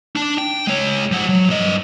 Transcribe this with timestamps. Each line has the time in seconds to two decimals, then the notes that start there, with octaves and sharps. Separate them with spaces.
0.16 D4 A5
0.38 G5
0.67 G#3 C#5
1.12 F3 F#5
1.29 F#3
1.50 G2 D#5